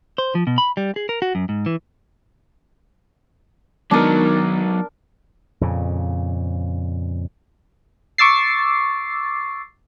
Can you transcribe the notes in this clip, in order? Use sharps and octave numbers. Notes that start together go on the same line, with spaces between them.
C5
F3
B2
B5
G3
G#4
A#4
F#4
F#2
G#2
E3
D#3 F#3 G#3 B3 D4 D#4 A#4 A6
F2 A#2 C#3
C#6 D6 E6 A6 C7